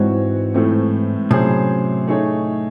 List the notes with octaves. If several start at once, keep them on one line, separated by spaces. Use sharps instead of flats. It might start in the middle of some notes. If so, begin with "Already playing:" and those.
Already playing: G#2 E3 C4 F#4 C#5
A2 E3 A3 C4
A2 C3 F#3 C#4 G#4 C5
A3 D#4 G#4 C#5